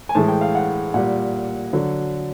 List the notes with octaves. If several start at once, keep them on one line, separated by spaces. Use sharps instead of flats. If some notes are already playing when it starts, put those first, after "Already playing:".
G#5
A2 E3 G#3 A5
G5
F5
F#5
A#2 G3 F#5
D3 F#3